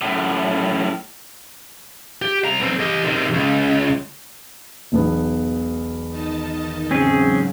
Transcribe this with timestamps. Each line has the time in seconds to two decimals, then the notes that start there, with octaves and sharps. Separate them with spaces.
0.01 F#2 A2
2.22 G4
2.45 C2 A#5
2.60 B1 C4
2.79 G4 D#5
3.05 C3 D#3
3.34 C#2
4.92 E1 B1 B3
6.10 D#3 D#4 A5
6.91 G#2 C#3 F#3 C4 C#4 G#4